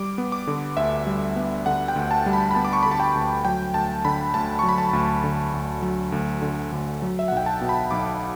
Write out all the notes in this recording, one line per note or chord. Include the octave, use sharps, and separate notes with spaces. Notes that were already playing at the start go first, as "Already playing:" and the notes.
Already playing: G3 D6
B3
D6
D3
D2 E5
G3
B3
D3 F#5
G5
D2
A5
G3
B5
B5
B3 A5
D6
C#6
D3 B5
A5
G5
D2
F#3 G5
D2 A5
D3 B5
D2 A5
F#3 C#6
B5
A5
D2
D3
D2
F#3
D2
D3
D2
F#3
E5
B1 F#5
G5
A5
B2
B5
B1 D6